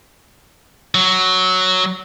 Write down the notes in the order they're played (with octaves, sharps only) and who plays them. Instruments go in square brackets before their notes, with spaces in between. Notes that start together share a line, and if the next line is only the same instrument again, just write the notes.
[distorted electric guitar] F#3